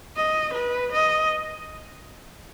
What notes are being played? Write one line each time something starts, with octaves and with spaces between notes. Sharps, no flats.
D#5
B4
D#5